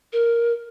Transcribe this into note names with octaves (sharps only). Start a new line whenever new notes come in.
A#4